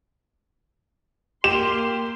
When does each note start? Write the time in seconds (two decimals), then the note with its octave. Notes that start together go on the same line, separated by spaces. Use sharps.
1.44 A#3 G4 C6 E7